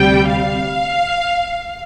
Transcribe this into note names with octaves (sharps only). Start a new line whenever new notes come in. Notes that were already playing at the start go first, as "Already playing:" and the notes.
Already playing: D2 C3 G3 G5
F5